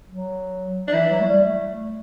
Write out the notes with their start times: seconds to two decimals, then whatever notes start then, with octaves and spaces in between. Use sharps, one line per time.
0.10 F#3
0.88 D4
0.93 E3 E4
1.10 F#3
1.21 A3
1.27 G3
1.43 A3